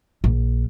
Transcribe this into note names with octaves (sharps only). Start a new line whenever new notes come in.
A#1